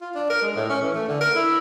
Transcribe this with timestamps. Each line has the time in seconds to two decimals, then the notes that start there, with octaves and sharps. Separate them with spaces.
0.01 F4
0.15 D4
0.30 A#4
0.42 G#3
0.56 A2
0.70 C#4
0.82 E3
0.95 A3
1.08 D3
1.21 A#4
1.35 E4